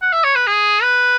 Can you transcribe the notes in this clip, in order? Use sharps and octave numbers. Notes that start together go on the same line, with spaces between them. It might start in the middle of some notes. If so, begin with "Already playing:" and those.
F#5
E5
C#5
B4
G#4
B4